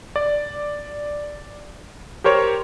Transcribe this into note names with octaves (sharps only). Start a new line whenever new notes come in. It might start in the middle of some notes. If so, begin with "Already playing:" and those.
D5
G4 A#4 C5 C#5